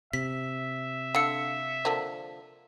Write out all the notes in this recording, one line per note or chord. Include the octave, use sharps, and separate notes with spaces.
C3 E5 B6
D3 F5 E6 C#7
D3 F3 A#3